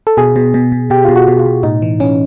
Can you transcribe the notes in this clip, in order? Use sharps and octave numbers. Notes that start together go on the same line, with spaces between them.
A4
B2 G#4
B2
B2
B2
B2 G4
B2 F4
F#4
B2
F4
B2
A2 D#4
E3
E3 C#4